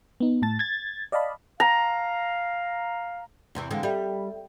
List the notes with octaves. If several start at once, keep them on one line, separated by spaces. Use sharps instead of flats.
B3 D#4
A2 A5 A6
G#6 A6
D5 D#5 F5 A5 B5
F5 A#5
E2 C3 E3
D3 E3 G#3 F5 G5
G3 A4 E5 G5